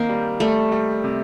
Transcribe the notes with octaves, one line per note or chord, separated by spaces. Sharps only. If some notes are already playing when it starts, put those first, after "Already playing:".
Already playing: D#3 A#3 C4
G3
G3 A3
G3
C3